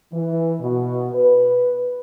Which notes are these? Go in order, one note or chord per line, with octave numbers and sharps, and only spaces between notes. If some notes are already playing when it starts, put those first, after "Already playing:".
E3
B2
B4